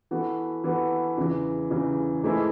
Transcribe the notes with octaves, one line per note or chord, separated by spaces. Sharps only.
E3 B3 F#4 A4
E3 B3 F#4 A4
E2 C#3 E3
E2 C#3 E3
G#2 E3 A3 E4 G#4